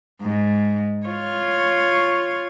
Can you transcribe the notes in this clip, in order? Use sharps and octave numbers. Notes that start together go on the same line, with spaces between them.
G#2
F4 C#5